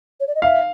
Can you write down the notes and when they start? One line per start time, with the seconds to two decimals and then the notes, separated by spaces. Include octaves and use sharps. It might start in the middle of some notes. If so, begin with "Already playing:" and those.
0.20 C#5
0.27 D5
0.34 D#5
0.42 E5 F5